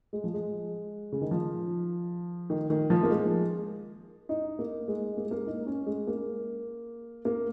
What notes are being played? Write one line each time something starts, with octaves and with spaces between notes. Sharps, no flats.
G#3
F3
G#3
C#3
D#3
F3
D#3
D#3
F3
A#3
G#3
D#4
A#3
G#3
A#3
G#3
A#3
D#4
C#4
G#3
A#3
A#3